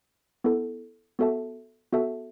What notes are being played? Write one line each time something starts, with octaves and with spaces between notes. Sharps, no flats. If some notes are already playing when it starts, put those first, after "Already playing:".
B3 E4 A4
B3 F#4 A4 E5 A5
B3 F#4 A4 E5 A5